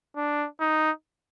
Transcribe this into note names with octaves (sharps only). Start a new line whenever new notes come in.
D4
D#4